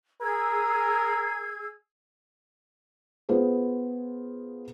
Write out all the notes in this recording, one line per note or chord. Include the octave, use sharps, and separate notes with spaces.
G#4 A#4 E6 G#6
B3 F4 G#4 B4 C5